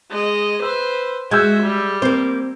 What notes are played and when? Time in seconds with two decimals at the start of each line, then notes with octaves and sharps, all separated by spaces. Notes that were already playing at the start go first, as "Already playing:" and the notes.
0.10 G#3 D#5
0.62 B4 C5 E6
1.31 G#3 F#4 E5 E6 G6 G#6
1.63 G3
2.02 A#3 C4 C5